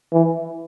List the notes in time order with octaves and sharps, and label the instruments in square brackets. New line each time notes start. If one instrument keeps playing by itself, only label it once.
[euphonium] E3